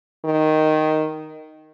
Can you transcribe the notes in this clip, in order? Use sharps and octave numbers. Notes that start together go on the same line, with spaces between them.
D#3